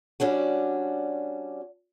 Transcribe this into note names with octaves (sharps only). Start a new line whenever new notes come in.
G3 C#4 D4 F#4